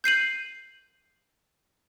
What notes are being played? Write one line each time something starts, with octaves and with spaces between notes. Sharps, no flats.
G6 C7 D#7 F#7